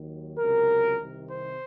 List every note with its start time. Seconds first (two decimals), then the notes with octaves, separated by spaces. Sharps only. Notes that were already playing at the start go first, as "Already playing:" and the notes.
Already playing: D#2 D#3 F#3
0.38 C#2 C3 F#3 A#4
0.99 C2 C3 D#3
1.29 C5